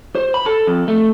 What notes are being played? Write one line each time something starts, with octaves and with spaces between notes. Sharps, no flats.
C5
B5
A4
F2
A3